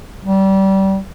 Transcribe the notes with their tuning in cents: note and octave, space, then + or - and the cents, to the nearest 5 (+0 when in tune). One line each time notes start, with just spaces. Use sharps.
G3 -25